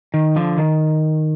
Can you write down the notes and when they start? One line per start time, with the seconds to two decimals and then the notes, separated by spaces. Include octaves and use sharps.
0.14 D#3
0.36 D3 F3
0.58 D#3